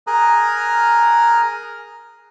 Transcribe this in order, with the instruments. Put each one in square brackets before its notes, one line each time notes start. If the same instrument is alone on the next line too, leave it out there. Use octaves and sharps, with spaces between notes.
[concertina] G#4 A#4 A#5 D#6 F6 F#6